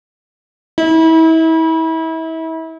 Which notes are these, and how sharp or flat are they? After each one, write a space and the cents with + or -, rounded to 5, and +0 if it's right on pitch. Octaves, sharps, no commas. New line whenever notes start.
E4 -35